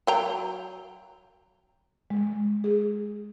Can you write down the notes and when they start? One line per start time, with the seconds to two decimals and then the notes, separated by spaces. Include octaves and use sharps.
0.07 F#3 G5 A#5
2.10 G#3
2.64 G#4